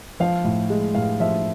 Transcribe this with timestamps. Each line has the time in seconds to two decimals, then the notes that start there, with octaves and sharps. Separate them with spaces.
0.20 F3 F5
0.44 A2
0.70 G#3
0.95 A2 F5
1.20 F3 E5